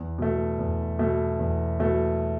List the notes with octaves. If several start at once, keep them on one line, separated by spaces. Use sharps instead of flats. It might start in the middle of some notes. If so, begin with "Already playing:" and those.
Already playing: E2
B2 A3
E2
B2 A3
E2
B2 A3